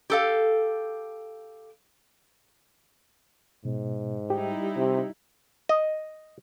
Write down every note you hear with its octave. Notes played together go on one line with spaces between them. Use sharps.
G4 A4 F5
G#2 B2
G3 D#4 E4 G4
C3
D#5